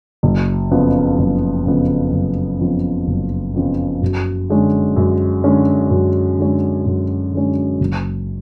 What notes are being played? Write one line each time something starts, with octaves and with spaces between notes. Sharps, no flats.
F#1
F2 C#3 F3 B3
F#1
F2 C#3 F3 B3
F#1
F2 C#3 F3 B3
F#1
F2 C#3 F3 B3
F#2
D3 G#3 C#4
F#2
D3 G#3 C#4
F#2
D3 G#3 C#4
F#2
D3 G#3 C#4
F#1